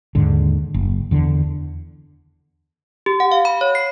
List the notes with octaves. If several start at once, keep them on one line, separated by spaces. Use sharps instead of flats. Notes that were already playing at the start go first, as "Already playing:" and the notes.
D#2 G#2 D3
F#1
E2 D3
G4
F#5
F5
B5
C#5
C7